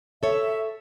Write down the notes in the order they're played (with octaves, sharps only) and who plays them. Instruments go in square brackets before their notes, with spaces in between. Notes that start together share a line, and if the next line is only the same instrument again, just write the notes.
[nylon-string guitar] A4 C#5 [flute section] E5